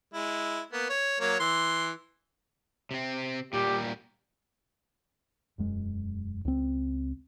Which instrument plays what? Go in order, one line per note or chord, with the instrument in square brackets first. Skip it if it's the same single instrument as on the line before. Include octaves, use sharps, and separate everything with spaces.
[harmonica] G#3 E4
A#3 B3
C#5
F#3 A#3 C#5
E3 C6
[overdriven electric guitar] C3 C4
[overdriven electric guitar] A#2 G3 [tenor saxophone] G4
[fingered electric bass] E1 F#2 G#3
C#2 C4